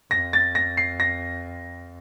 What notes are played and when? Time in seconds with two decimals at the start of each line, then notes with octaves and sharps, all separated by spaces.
0.11 F2 A#6
0.33 A6
0.55 A#6
0.77 C7
1.00 A#6